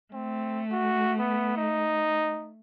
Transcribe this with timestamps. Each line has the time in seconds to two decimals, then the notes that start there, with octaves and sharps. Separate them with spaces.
0.13 A3 C4
0.72 F#4
1.19 B3
1.57 D#4